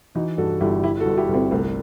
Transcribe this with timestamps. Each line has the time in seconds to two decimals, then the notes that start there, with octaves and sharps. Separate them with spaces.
0.15 E3 D#4 F#4
0.38 G2 F#4 A4
0.61 G1 E4 G4
0.83 G1 E4 G4
1.00 F#4 A4
1.05 G1
1.17 E4 G4
1.28 G1
1.34 C4 E4
1.51 C2 A3 C4